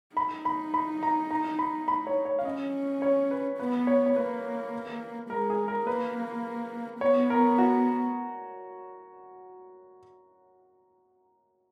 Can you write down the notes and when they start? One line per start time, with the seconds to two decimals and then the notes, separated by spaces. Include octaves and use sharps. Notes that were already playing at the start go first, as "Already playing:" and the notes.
0.16 D#4 B5
0.45 B5
0.74 B5
1.03 A#5
1.31 A#5
1.59 B5
1.88 B5
2.07 C#5
2.25 C#5
2.39 F5
2.45 C#4 D#5
3.02 C#5
3.31 B4
3.59 B3 B4
3.87 C#5
4.06 C#5
4.16 A#3 B4
5.30 G#3 A#4
5.50 G#4
5.68 A#4
5.87 A#3 B4
7.01 B3 C#5
7.30 A#4
7.58 F#4